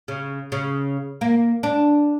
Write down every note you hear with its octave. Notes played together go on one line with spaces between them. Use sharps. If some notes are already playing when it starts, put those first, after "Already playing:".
C#3
C#3
A#3
D4